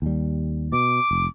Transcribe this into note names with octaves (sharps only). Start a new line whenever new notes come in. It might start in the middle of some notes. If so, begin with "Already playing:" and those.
D#2 G3
B2 D6
F1